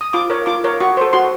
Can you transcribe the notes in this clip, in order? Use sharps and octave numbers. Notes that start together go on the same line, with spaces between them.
D#6
F4 D6
A#4 C#5
F4 D6
A#4 C#5
F#4 C#6
A4 C5
F#4 C6